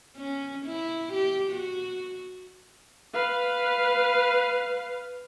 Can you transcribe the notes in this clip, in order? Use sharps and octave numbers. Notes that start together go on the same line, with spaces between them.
C#4
E4
G4
F#4
B4 F5